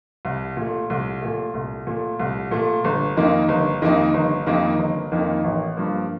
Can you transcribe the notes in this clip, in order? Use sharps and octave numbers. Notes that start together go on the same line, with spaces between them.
C2
A#2 A3
C2
A#2 A3
C2
A#2 A3
C2
A#2 A3
G1
F2 D#3 A#3 D#4
G1
F2 D#3 A#3 D#4
G1
F2 D#3 A#3 D#4
G1
F2 D#3 A#3 D#4
A1
G2 F3 A#3